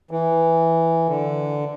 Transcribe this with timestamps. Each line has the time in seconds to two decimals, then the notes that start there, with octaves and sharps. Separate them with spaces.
0.11 E3
1.09 D3